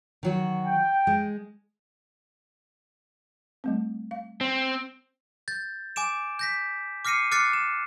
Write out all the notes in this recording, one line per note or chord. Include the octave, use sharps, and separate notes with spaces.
D#3 F#3 F#4
G5
G#3
G3 A3 C4
F5
C4
G6 A6
G#5 D6 D7 E7
G6 A#6 B6
D6 F6 A#6 C7 C#7 D#7
D6 F6 F#6 A6 C7 C#7
E7